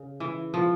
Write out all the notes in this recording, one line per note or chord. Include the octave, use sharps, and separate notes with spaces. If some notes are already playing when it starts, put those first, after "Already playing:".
Already playing: C#3
E3
F3